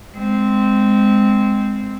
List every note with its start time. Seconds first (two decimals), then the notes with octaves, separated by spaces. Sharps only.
0.14 G#3 C4